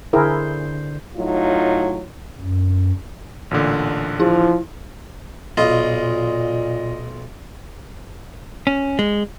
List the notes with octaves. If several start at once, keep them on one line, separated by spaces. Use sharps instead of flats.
D3 E4 G#4 A#4 C5
A2 F#3 D#4 F4
F#2
A1 A#2 D3
F3 E4
B1 A#2 F4 D#5
C#4
G#3